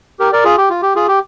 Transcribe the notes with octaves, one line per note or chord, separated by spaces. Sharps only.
G4 A#4
A#4 D5
F4 G#4
G4
F4
G4
F4 G#4
G4